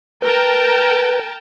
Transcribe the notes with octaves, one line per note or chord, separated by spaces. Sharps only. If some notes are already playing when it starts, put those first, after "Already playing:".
A#4 B4 G5 A5